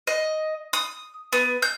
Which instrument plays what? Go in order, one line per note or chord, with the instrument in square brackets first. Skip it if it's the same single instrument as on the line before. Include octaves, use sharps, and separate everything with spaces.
[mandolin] D#5
D#6
B3
G6